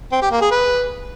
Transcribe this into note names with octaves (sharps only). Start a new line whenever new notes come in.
C4
G4
A#3
G#4
B4